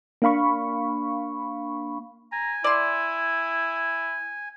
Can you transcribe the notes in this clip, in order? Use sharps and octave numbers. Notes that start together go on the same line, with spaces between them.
A#3 D4 F5 B5 C#6
G#5 A#5
E4 D5 C6